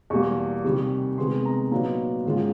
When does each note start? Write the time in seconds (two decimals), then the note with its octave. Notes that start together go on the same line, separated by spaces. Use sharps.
0.10 E2 B2 G3 A#3 C#6
0.64 C3 D#3 G3
1.18 C3 D#3 G#3 B3 C6
1.45 A#5
1.72 A#2 F#3 B3 D#4 A#5
2.25 G#2 D#3 G#3 C#4 F4